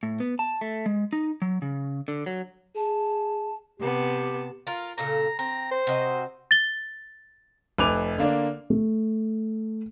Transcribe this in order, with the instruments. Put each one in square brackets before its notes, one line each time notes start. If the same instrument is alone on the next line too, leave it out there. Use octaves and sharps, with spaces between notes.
[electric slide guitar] A2
B3
A5
A3
G#3
D#4
F#3
C#3
D3
F#3
[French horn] G#4 [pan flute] A5
[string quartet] C3 B3 A5 [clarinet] G4
[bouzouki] F4 A#4
[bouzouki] A#2 C#3 A4 [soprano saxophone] A#5
[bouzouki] C4 [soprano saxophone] A#5
[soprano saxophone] C5
[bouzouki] C3 F#4 D#5
[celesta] A6 G7
[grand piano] F1 B4 G#5 D6 F7
D3 A#3 D4
A3